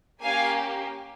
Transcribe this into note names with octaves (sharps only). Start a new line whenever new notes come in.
A#3 C#4 G4 F5 G#5